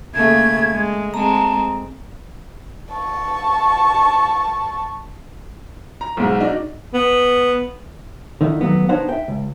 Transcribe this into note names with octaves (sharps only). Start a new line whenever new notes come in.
C#3 A3 A#3 G#6
G#3
G#3 C4 A5 A#5
A5 C#6
A#5
B1 G#2
D4 D#4 F#4
B3
D3 D#3 D#4 E4
D#3 F#3 A3 B3
B3 D4 D#4 C5 C#5 F#5
E5 G5
C#2